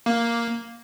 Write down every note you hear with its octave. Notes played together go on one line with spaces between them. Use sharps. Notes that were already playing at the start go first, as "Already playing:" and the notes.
A#3